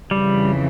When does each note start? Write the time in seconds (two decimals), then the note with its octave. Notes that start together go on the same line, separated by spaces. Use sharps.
0.11 F2 C#3 E3 G3